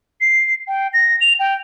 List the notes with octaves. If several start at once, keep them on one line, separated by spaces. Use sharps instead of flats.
C7
G5
A#6
F7
G5